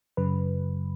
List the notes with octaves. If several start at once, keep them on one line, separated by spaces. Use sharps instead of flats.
F#2 C#3 F#3 B4